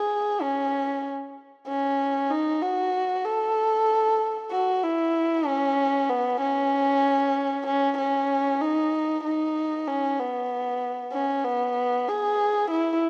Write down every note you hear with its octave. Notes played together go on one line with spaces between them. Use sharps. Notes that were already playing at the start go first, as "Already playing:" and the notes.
Already playing: G#4
C#4
C#4
D#4
F#4
A4
F#4
E4
C#4
B3
C#4
C#4
C#4
D#4
D#4
C#4
B3
C#4
B3
G#4
E4